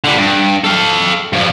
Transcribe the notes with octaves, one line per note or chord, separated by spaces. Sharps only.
D3 G3
G2
A4 F5
G2 F3